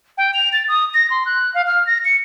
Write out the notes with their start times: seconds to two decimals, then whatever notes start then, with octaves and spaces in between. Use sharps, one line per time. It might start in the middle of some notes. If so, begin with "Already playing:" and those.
0.18 G5
0.34 F7
0.53 A6
0.68 D#6
0.94 A#6
1.10 C6
1.26 F#6
1.54 F5
1.67 F6
1.87 A#6
2.05 C#7